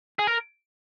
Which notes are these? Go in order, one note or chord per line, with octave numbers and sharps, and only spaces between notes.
G#4
A#4